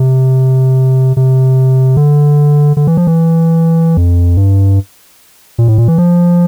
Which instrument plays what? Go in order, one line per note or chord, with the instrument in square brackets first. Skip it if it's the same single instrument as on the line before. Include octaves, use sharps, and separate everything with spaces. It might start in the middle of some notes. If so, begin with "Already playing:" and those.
Already playing: [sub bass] C3
C3
D3
D3
E3
F3
E3
F2
G2
A#2
A2
A#2
E3
F3